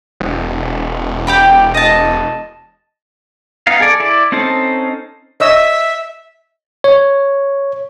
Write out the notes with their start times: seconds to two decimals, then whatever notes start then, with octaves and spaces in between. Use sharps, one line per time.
0.20 E1
1.27 G4 G5 B5
1.74 D#5 A5
3.67 B3 D#4 F5
3.80 G#4 A4 D5
4.00 E4 D5
4.32 C4 C#4 D#4 A4 C5
5.40 C#5 D#5 E5 E6
6.84 C#5